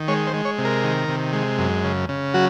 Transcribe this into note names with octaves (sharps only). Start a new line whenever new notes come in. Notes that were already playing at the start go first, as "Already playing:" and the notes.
Already playing: D#3
G#3 C#5
C5
G#3
C#5
C3
A#4
D#3
C3
G#3
F#2
C#3
C#3
F#3 F#4